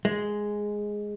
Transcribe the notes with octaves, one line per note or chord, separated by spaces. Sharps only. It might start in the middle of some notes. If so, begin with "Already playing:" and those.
G#3